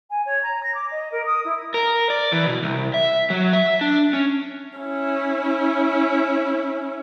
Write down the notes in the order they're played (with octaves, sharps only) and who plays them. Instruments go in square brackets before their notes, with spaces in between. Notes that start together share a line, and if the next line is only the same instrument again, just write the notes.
[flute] G#5
C#5
A#5
A#6
D6
D#5
A#4
D#6
E4
[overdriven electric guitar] A#4
D5
E3
B2
C2
E5
F#3
E5
D4
C#4
[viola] C#4 E4